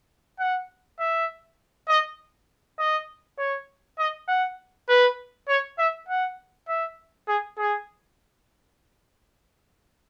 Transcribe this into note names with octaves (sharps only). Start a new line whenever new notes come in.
F#5
E5
D#5
D#5
C#5
D#5
F#5
B4
C#5
E5
F#5
E5
G#4
G#4